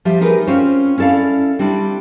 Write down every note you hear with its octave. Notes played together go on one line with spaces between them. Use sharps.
F3 G3 G4 E5
D#4 G4 G#4 A#4 B4
C4 C#4 F4 C5
C#4 E4 A4 D5 F5
G3 C4 D4 E4